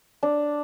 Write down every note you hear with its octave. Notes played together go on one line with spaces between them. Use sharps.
D4